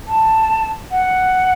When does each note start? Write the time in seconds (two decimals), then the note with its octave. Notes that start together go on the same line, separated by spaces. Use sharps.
0.08 A5
0.91 F#5